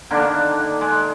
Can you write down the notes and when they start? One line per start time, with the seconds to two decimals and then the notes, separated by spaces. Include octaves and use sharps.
0.11 D3 D#3 A#3 D4
0.81 G#3